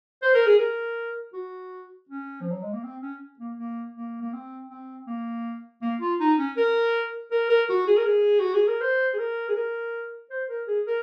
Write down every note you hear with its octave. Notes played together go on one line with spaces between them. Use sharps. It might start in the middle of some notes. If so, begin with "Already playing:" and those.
C5
A#4
G#4
A#4
F#4
C#4
F3
F#3
G#3
A#3
C4
C#4
A#3
A#3
A#3
A#3
C4
C4
A#3
A#3
F4
D#4
C#4
A#4
A#4
A#4
F#4
G#4
A#4
G#4
F#4
G#4
A#4
C5
G#4
A#4
G#4
A#4
C5
A#4
G#4
A#4